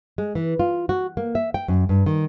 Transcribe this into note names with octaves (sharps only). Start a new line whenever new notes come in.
G#3
E3
F4
F#4
A#3
E5
G5
F#2
G2
D#3